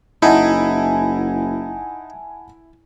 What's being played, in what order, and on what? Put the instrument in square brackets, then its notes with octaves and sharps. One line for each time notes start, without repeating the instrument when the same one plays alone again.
[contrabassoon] F#1 [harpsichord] D#4 [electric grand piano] E4 [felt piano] F#5 G#5 A5